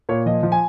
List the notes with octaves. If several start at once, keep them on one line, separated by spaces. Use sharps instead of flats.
A#2 C#5
F3 D#5
F3
G#5